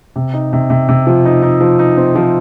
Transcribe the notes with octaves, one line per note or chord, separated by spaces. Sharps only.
C3
D#4
C3
C3
C3
F3
D#4
D#4
F3
D#4
C4
F3